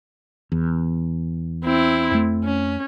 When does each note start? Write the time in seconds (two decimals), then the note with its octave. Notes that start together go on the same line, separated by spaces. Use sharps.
0.52 E2
1.64 C4 E4
2.11 F2 A3
2.44 C#4